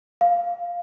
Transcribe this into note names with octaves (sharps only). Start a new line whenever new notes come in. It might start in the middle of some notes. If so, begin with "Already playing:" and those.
F5